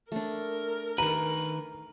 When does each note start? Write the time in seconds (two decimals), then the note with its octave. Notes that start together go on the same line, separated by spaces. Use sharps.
0.12 A3 D4 A#4
0.98 D#3 B4 A#5